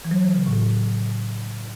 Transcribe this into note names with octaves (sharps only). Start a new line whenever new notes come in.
E3
F#3
E3
C#3
A2